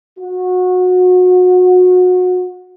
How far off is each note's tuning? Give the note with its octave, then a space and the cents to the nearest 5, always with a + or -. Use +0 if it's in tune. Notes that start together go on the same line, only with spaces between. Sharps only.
F#4 -25